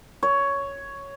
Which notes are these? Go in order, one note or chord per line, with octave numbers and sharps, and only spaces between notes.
C#5